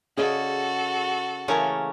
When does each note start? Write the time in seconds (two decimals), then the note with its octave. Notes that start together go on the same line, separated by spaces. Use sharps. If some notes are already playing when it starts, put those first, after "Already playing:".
0.17 C#3 F#4 G#4 A4 D5 D#5
1.48 C#3 E3 A3 A#3 C#4 A#4